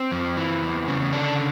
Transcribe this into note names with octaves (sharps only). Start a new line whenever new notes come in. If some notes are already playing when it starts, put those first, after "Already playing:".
Already playing: C4
F2
E3
E2
C#3
D3 D4